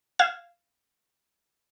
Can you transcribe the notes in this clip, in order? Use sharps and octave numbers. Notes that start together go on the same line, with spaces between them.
F5 G#6 E7